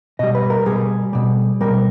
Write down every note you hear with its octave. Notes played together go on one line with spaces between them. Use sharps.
B2 G3 D#5
B4
A#4
B2 G3 G#4
B2 G3
B2 G3 A#4